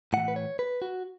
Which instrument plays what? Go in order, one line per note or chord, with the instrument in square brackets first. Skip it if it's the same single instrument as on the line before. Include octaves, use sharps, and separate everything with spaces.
[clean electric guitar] A2 E3 F#5
B4
C#5
B4
F#4